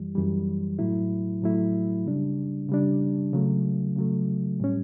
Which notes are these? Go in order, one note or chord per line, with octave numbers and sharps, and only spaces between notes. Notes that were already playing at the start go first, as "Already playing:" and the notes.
Already playing: F#2 E3 G3
F#2 E3 G3
A2 F#3 A3 E4
A2 F#3 A3 E4
C#3 G3 D4
C#3 G3 D4
C#3 F#3 A3
C#3 F#3 A3
A2 G3 C#4